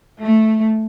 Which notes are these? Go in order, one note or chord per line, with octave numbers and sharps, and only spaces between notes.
A3